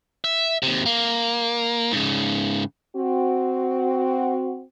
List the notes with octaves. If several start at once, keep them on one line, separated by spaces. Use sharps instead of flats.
E5
D#2 C3
A#3
G#2 C#3
C4 F#4